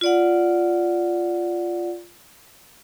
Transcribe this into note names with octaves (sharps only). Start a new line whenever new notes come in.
F4 D5 F#5